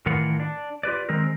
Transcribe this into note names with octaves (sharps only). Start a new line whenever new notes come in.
A2 D#3 E3 F4 A#4 F#5
D4
F4 G4 B4 D5
D#3 G#3 C4 A#4